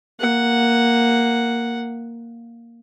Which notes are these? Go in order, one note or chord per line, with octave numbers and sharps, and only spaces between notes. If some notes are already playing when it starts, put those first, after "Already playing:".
A#3 F#5